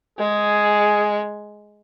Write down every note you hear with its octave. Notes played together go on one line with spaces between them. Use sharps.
G#3 G#4